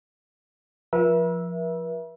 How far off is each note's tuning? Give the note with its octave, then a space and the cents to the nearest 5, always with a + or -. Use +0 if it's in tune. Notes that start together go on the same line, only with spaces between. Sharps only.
F3 +0 B4 -45 E5 +0